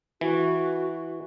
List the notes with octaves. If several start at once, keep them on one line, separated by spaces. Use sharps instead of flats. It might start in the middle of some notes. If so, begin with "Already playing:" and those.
E3 F#4